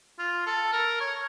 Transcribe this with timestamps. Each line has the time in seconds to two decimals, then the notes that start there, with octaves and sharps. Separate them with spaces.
0.19 F4
0.46 A4
0.73 A#4
1.01 C#5